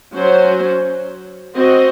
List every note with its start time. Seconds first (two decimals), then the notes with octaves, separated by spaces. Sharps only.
0.14 F#3 C#4 F#4 C5
1.55 C4 F#4 C5 D#5